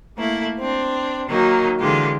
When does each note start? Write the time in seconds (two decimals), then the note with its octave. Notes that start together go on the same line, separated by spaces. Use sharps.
0.17 A3 A#3 E4
0.59 C4 D4
1.29 D#3 F#3 A#3 D#4
1.79 D3 E3 G#3 F4 G4